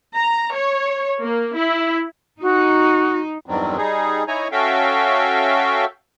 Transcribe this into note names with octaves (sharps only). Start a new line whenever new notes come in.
A#5
C#5
A#3
E4
D#4 F#4
E2 G2 D#3 F#3 G3 C4
G3 D#4 G#4
D#4 E4 C#5 G#5 A#5
C#4 F#4 A4 E5 F5 G5